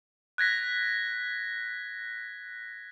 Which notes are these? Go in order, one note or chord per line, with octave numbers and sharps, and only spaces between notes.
F#6 G#6 A#6 B6